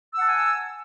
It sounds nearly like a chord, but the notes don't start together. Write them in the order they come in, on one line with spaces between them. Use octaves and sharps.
E6 F#5 A5 G#5